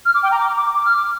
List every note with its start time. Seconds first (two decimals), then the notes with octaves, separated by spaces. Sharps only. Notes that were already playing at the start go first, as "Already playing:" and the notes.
0.05 F6
0.15 D6
0.23 G5
0.31 A#5
0.40 D6
0.57 D6
0.74 D6
0.85 F6
0.97 D6